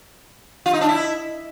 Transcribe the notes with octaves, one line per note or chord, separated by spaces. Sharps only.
F4
D#4
D4
E4